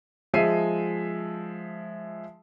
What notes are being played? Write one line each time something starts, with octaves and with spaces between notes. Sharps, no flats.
F3 G#3 E5 C7 D#7